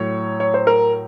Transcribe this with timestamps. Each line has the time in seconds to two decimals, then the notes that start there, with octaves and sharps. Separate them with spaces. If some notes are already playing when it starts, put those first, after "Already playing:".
Already playing: A2 F#3 A3 C#5
0.40 C#5
0.54 C5
0.67 A#4